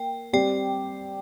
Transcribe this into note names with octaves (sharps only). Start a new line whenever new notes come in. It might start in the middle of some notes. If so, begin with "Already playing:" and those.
Already playing: A#3 G5
G3 C4 G4 D5 G5